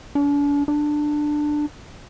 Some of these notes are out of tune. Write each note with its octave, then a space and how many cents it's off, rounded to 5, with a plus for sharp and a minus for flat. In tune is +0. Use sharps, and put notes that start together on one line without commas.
D4 -40
D4 +15